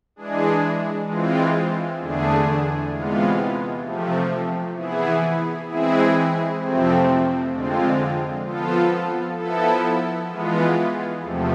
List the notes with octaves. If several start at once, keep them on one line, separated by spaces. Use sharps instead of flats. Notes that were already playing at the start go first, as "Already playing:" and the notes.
E3 G#3 D4 G#4
E3 G#3 C4 F4
E2 D3 A3 D4 G#4
C3 E3 G#3 B3 F4
C3 F3 A3
E3 B3 E4 G#4
E3 G#3 C4 E4 G#4
F2 C3 F3 A3 C4
F2 D3 G#3 C4 F4
F3 B3 F4 A4
F3 B3 E4 A4
E3 G#3 B3 F4
E2 C3 F3 A3